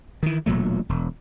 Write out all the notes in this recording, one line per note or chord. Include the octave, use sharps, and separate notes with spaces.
D#3 E3
E1 A#2 F#3 A3
E1